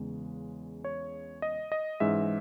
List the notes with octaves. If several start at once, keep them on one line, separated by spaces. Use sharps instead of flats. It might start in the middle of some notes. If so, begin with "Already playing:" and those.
Already playing: E2 C#3 G#3
C#5
D#5
D#5
G#2 E3 G#3 C#4 E5